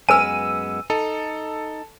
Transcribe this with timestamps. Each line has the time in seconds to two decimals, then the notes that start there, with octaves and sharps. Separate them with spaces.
0.09 F#2 G#3 B3 B4 G#5 E6 D#7
0.90 D#4 A4